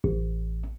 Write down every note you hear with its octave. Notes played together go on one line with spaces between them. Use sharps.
A1